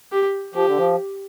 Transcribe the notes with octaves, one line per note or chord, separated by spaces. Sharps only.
G4
F3 G4
D3
F3